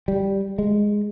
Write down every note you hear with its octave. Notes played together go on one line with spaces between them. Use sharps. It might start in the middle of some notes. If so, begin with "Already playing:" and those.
G3
G#3